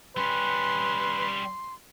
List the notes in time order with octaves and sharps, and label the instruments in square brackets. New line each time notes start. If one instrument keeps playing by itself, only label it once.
[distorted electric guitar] G3 C#4 [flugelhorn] B4 [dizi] C6